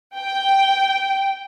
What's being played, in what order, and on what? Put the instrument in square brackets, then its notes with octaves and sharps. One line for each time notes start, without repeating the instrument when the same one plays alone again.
[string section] G5